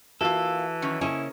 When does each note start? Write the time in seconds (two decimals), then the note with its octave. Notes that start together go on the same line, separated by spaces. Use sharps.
0.21 E3 A#3 F4 F#4 A4 E5
0.82 D#3 F#3 C#4
1.01 C#3 A#3 C#4 E4 C5 D#5 G#5